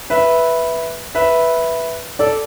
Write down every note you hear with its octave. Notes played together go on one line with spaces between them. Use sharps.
B4 E5
B4 E5
A4 D5